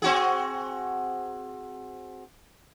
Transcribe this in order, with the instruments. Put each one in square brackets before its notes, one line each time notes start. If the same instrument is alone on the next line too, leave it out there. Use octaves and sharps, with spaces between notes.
[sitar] C4 F#4 G#4